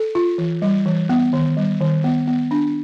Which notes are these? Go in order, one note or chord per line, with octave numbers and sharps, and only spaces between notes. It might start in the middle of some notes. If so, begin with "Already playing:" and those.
Already playing: A4
F4
E3
G3
E3
B3
D#3
G3
D#3
B3
B3
D4